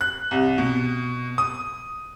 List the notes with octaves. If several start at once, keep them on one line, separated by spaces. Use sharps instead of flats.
F#6
C2
B2
D#6